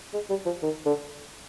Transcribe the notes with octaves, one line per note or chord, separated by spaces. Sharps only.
G#3
G3
F3
D#3
D3